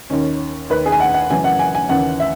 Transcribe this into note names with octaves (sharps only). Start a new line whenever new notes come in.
D#2 D#3 C#4
D#2 D#3 B4
G#4
G#5
F#5
F#5
F#2 C#3 E3 G#5
F#5
G#5
G#5
D#2 C#3 E3 F#5
E5